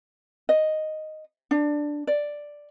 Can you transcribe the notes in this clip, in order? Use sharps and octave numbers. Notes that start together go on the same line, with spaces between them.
D#5
D4
D5